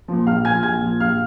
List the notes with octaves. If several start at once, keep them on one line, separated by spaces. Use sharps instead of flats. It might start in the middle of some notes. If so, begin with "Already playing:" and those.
A#2 F3
A#1 F5 F6
A#2 F3 G#5 G#6
A#1 G#5 G#6
A#2 F3
A#1 F5 F6